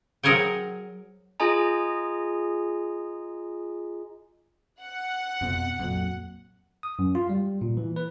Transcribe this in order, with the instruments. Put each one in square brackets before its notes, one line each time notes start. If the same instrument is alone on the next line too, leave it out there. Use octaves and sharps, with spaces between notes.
[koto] F#3 G#4 A#4 C5 C#5 G5
[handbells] F4 G#4 D#5 G#5 A#5
[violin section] F#5
[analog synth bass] F2 [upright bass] B2
[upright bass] A#1 F#3 [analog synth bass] F2
[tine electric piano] D#6
F#2
F4
G3
A#2
E3
B4